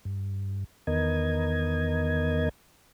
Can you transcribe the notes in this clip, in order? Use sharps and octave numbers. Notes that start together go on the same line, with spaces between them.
G2
E2 D#3 B3 A#4 D#5 G#6